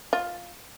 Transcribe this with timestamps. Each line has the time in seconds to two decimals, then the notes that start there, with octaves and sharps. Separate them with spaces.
0.13 F4